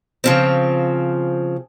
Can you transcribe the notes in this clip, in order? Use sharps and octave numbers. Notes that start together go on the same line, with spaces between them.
C#3 F3 C4